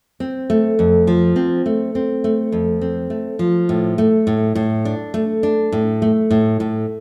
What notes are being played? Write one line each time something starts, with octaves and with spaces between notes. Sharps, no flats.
C4
A3
F2
F3
C4
A3
C4
A3
F2
C4
A3
F3
A2
A3
A2
A2
D4
A3
D4
A2
A3
A2
A2